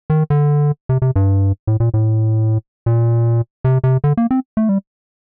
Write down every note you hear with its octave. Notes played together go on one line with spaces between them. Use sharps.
D#3
D3
C3
C3
G2
A2
A#2
A2
A#2
C3
C3
D3
A#3
C4
A3
G3